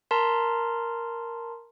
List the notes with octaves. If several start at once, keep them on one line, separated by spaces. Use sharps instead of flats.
A#4 A5 A#5 C6